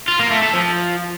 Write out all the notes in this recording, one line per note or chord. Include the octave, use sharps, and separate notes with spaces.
F4
A#3
A3
A4
F3